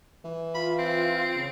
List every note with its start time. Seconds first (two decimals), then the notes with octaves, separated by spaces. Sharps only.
0.25 E3
0.55 F4 B5
0.79 C4 F4
1.36 C#3